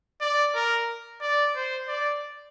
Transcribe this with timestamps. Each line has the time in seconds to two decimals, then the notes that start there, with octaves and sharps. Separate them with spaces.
0.21 D5
0.55 A#4
1.21 D5
1.56 C5
1.88 D5